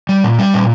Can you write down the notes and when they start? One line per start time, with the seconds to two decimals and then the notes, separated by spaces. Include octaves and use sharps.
0.09 G3
0.24 A#2
0.39 G3
0.54 A#2